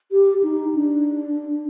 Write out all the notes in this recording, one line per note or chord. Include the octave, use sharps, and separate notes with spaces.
G4
D#4
D4